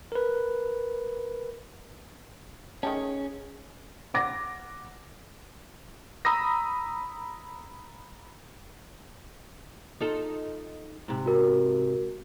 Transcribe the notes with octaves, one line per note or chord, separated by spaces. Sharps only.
A#4 B4
D#3 A3 C#4 G#4 A5
F#5 D6 A#6
A#5 B5 D#6 E6 A#6
D#4 F4 A4
G#2 C3
F#4 A#4